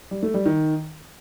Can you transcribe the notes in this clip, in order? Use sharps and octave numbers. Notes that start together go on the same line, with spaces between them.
G3
A3
G3
D#3